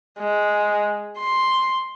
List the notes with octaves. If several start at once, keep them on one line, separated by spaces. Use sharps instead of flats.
G#3
C6